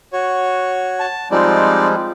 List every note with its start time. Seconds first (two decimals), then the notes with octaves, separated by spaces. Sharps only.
0.13 F#4 C#5
1.00 A5
1.31 F3 G3 G#3 C4 D#4 D5